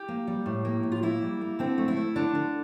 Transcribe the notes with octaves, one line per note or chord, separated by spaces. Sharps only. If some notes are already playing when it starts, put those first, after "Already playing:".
Already playing: G4
A#3
G3
A2
A#3
A2
F4
A#3 E4
G3
A#3
D3 C4
A3
E4
A3
D3 D4
D3